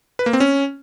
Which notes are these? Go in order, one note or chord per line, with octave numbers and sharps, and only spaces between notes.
B4
A#3
C4
C#4